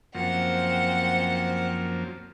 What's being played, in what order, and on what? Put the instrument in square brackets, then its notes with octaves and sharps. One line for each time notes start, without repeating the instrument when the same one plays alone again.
[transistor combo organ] F#2 F3 A#3 [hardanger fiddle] C4 F#5